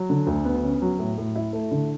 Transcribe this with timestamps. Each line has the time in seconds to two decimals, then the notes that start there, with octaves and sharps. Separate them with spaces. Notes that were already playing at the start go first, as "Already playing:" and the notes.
Already playing: F#3
0.10 D3
0.27 D2
0.45 B3
0.64 C#4
0.82 F#3
0.99 A2
1.18 A2
1.36 E4
1.53 A3
1.71 D3